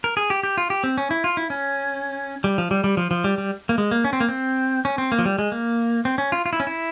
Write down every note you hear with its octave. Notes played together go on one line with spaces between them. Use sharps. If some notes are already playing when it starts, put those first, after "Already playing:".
A#4
G#4
G4
G4
F4
G4
C4
C#4
E4
F4
E4
C#4
G3
F3
G3
G3
F3
F3
G3
G3
A#3
G#3
A#3
C#4
C4
A#3
C4
C#4
C4
A#3
F3
G3
G#3
A#3
C4
C#4
F4
F4
E4
C#4
E4